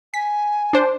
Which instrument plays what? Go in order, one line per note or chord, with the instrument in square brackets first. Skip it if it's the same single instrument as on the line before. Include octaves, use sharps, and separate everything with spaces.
[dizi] G#5 [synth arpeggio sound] B6
[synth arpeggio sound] D4 C5